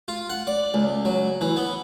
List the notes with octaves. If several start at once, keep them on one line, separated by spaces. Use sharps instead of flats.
F4
F#5
D5
C#2
F#3
E3
B3